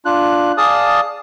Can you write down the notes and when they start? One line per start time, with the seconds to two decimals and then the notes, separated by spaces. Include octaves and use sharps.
0.05 D4 F4 F#6
0.58 G#4 D5 F5 A5 D#6